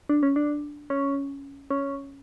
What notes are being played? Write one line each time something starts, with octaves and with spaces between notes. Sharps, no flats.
D4
C#4
D4
C#4
C#4